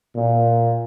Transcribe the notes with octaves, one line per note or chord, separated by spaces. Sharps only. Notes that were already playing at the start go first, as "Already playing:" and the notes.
A#2